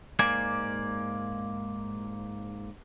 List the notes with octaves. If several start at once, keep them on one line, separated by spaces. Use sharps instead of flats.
G#2 A#3 D5 G#5